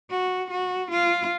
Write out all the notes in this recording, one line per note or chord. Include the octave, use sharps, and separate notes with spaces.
F#4
F#4
F4